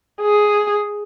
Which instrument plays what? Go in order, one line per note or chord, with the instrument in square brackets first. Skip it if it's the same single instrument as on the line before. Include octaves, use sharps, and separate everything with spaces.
[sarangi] G#4